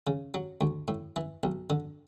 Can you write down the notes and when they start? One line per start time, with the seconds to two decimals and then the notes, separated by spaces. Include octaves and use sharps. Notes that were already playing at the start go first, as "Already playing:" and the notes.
0.07 C#3
0.34 F#3
0.61 D2
0.88 A2
1.16 E3
1.43 B1
1.70 D3